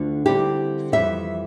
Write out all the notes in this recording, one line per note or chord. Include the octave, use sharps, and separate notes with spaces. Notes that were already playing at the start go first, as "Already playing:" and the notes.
Already playing: D2 D3 A3 D4 F4
D3 G3 C4 E4 G4
F2 E3 G3 E5